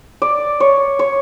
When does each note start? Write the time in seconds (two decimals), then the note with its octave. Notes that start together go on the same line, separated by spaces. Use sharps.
0.22 D5
0.60 C#5
0.99 C#5